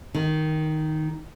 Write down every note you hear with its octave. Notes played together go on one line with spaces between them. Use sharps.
D#3